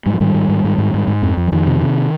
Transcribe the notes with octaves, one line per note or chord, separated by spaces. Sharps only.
G#2 G3
F3
G#2 D#3 G3
G#2
G#2
G#2
G#2
G#2
G#2
F2
F2
F3
F2 D#3
C3
C3